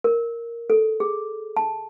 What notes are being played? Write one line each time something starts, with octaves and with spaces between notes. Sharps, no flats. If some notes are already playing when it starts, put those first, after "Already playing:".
A#4
A4
G#4
A5